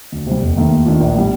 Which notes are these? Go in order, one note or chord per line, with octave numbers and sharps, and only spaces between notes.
D2
C3 G3
F1
D#2 D#3 A3 D#4
D#2
D#3 A3 D4 F4
A#1
A2 G3